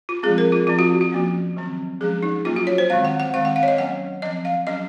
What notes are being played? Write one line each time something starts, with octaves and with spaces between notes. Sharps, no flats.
F4
F3 G#3 C4 G#4
A#4
F4
F3 C4 F4
F#4
F#4
F3 A#3 C#4
D#3 F#3 C4
F3 G#3 C#4 G#4
D#4
F#3 A#3 C#4 F4
F#4
C#5
C5
D#3 G#3 C4 F5
F#5
F#5
D#3 G#3 C4 F5
F#5
F5
C#5
D#5
F#3 A#3 C#4 F#5
F3 C4 D#5
F5
F#3 C#4 D#5